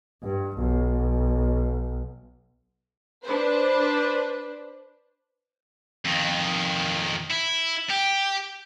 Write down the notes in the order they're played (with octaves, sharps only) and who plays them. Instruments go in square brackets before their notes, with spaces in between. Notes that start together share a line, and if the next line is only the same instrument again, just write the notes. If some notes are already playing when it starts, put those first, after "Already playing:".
[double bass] G2
B1
[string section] D4 B4 C5
[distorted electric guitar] F2 D#3
E4
G4